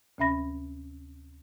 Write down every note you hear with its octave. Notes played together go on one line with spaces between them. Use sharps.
D2 C3 C#4 E5 B5 A#6